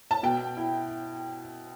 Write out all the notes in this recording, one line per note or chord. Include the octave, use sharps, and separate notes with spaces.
A5
B2 G5
E4